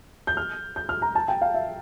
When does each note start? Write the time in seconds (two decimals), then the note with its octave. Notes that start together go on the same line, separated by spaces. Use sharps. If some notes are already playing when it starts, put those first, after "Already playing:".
0.27 G6
0.37 F6
0.76 G6
0.89 F6
1.02 A#5
1.15 A5
1.28 G5
1.42 F5
1.54 E5